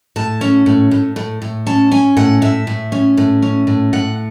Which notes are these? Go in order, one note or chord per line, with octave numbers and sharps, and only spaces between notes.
A2 A5
C#4
A2
A2
A2
A2
C#4 A5
C#4 G#5
A2 F#5
A2 E5
A2
C#4
A2
C#4
A2
A2 F#5